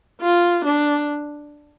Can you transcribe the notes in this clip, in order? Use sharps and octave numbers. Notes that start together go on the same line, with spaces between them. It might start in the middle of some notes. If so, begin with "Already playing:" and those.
F4
D4